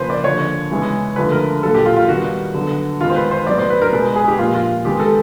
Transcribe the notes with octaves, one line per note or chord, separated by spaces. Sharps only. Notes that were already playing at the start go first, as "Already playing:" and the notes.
Already playing: C#3 F3 A#3 B4 C5
D5
D3 F3 A#3 C#5
C#3 E3 G#3 B3
D3 F3 A3 B4
A#4
A#2 F#3 A#3 A4
G4
F4
F4
D#3 G3 B3 F#4
D3 F#3 B3
D#3 G#3 B3 F4
C5
B4
C5
A2 F#3 B3 D5
C5
B4
A#4
B2 G#3 B3 B4
G#4
G4
A#2 F3 A#3 F4
F4
D#3 G#3 B3 G4
A4